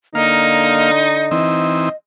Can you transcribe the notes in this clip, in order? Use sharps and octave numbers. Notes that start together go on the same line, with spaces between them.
D3 A#3 D#4 D#5 F5
E3 C4 D#4